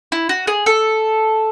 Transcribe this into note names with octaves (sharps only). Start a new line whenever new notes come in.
E4
F#4
G#4
A4